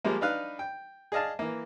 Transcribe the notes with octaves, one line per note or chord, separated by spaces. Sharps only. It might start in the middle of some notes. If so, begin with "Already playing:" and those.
F3 G3 G#3 A#3
D4 D#4 B4 F5 F#6
G5
G#4 D5 D#5 F5 A5
E3 A#3